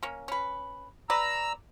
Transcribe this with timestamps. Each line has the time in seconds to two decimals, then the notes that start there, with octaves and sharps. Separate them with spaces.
0.03 A#3 C#4
0.28 C#4 B4
1.10 B4 D5 A#5 E6